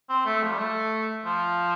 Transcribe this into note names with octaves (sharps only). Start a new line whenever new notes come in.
C4
A3
F3
G3
A3
F3